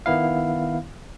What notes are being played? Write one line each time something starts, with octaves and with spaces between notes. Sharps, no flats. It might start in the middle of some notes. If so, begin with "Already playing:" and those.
D#3 B3 E4 F5